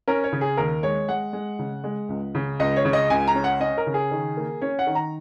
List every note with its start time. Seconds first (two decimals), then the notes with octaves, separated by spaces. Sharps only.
0.08 C#4 A#4
0.24 C#5
0.32 C#3
0.41 G#4
0.57 D#2 A#4
0.83 G#3 C#5
1.09 G#3 F#5
1.33 G#3
1.59 C#3
1.84 G#3
2.09 C#2
2.35 C#3
2.59 C#2 D#5
2.76 C#5
2.85 C#3
2.93 D#5
3.10 C#2 G#5
3.27 A#5
3.35 C#4
3.44 F#5
3.60 C#4 D#5
3.78 A#4
3.87 C#3
3.94 G#4
4.11 D#3
4.37 A#3
4.62 C#4 C#5
4.79 F#5
4.87 D#3
4.95 A#5